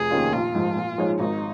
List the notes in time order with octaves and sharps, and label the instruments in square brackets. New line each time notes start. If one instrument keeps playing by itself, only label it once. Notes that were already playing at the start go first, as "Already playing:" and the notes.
Already playing: [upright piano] F1 [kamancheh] G#4
[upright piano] D#2 D#3 C#4 F4
[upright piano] A#1 [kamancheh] F4
[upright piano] G#2 F3
A#2
F3 G#3 D#4 C#5
[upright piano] G#1 [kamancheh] D#4